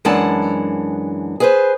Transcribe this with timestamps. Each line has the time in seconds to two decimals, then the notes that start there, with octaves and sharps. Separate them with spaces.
0.05 F#2 E3 G#3 D4 F#5 A5
1.40 G#4 B4 C5